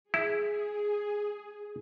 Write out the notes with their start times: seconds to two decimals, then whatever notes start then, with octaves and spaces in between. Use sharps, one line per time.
0.14 E4 G#4